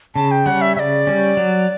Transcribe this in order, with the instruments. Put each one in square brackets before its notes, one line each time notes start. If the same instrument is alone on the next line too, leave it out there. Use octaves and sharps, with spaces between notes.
[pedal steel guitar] C#3 [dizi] A5
[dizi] G5
[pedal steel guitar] G3 C#4 [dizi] F#5
[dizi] E5
[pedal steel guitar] C#3 [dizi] D5 E5
[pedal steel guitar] G3 C#4
F#3